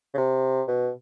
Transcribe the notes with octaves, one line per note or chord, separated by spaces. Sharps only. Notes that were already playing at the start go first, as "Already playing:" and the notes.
C#3
C3
B2